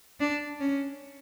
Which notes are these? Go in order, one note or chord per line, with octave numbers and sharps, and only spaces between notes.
D4
C#4